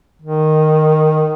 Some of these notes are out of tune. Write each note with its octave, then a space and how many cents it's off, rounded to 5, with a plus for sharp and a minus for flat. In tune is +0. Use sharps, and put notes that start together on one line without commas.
D#3 -5